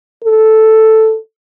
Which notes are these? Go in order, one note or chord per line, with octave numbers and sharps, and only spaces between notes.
A4